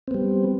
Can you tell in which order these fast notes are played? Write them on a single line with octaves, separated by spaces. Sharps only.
C4 B3 G3